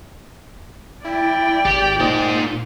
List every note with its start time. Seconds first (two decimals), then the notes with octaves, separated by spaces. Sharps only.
1.05 E4 D5 G5
1.65 G#1 G4
2.00 A#2 D#4 C5